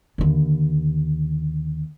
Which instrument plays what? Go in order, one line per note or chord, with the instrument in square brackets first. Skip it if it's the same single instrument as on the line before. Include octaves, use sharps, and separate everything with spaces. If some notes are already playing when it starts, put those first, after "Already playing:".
[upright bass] D#2 D3